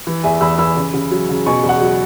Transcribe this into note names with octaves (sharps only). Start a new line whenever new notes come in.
E3
E2 E5 G#5
E2 B5 E6
E3 B5 E6
C#3
C#3
F#3
C#3
B2 G#5 C#6
E2
F#5
F#3